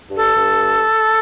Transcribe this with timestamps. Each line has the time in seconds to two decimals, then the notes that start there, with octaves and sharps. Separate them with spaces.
0.10 G2
0.16 A4
0.36 G2